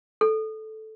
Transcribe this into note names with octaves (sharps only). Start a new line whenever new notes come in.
A4